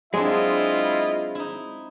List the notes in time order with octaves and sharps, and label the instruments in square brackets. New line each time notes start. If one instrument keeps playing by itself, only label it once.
[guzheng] F#3 C4 D4 [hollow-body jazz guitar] G#3 [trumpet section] E4 F4 D#5
[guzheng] D#4 E4